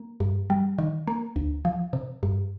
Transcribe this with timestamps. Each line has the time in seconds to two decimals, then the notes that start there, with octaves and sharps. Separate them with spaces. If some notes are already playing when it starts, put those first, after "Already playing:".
Already playing: A#3
0.20 G2
0.50 G3
0.78 D#3
1.07 A#3
1.36 D2
1.65 F3
1.93 C3
2.23 G2